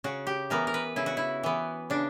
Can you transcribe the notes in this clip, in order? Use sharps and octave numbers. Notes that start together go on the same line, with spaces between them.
C#3 F#4
G4
E3 B3 A#4
A#4
B4
C#3 E4
F#4
E4
E3 B3
C#3 D4